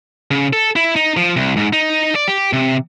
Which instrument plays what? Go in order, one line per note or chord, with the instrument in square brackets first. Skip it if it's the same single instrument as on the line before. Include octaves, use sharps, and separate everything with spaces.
[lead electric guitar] C#3
A4
E4
D#4
F3
C2
G#2
D#4
D5
G4
C3